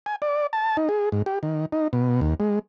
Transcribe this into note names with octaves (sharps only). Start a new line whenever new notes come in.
G#5
D5
A5
D#4
G#4
G#2
G4
D#3
D#4
B2
D#2
G#3